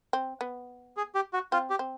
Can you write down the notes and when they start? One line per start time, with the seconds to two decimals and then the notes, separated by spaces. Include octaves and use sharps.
0.13 C4
0.41 B3
0.97 G#4
1.15 G4
1.33 F#4
1.52 C4 F4
1.70 G4
1.79 C4